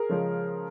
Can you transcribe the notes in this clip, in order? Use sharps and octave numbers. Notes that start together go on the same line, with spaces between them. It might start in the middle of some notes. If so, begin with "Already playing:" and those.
Already playing: G#4 A#4
C#3 F3 G#3 C#4